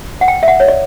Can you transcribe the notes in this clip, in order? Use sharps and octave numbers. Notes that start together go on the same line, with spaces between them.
F#5
G5
E5
F#5
C#5
D5